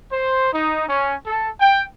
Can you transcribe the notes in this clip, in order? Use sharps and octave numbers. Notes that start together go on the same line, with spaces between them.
C5
D#4
C#4
A4
G5